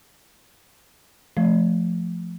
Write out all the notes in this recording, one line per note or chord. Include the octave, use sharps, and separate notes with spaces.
F3 A3